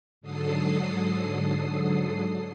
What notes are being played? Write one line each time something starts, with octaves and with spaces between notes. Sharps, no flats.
G#2 D3 F#3 A4 D#6 C7